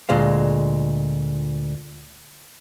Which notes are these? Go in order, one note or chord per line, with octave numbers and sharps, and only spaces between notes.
D2 A#2 G#3 F5